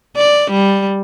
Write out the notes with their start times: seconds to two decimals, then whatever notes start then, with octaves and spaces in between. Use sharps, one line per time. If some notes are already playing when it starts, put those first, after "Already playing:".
0.16 D5
0.51 G3